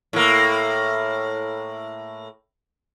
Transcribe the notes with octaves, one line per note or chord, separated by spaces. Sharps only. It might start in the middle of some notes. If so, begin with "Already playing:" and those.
A2 A#3